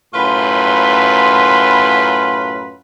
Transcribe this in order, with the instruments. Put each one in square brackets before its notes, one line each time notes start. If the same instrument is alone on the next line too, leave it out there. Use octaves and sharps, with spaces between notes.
[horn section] F#2 A2 F4 B4 B5 C6